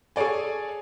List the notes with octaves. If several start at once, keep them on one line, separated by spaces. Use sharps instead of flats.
G#4 A4 C#5 D5 G#5